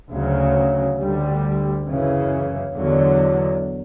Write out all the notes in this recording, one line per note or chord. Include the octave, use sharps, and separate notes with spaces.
D2 C#3 F#3
D2 D3 G3
F#2 C#3 E3
E2 D3 F#3